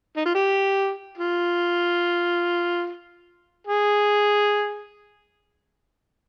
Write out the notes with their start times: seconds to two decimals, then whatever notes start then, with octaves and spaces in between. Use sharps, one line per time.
0.17 D#4
0.25 F4
0.35 G4
1.17 F4
3.67 G#4